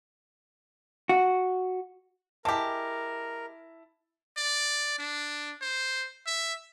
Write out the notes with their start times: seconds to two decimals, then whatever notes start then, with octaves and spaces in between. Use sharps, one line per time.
1.09 F#4
2.45 G#3 E4 G4 A#4 A5
4.37 D5
4.99 D4
5.61 C5
6.26 E5